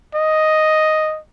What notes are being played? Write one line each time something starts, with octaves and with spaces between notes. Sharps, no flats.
D#5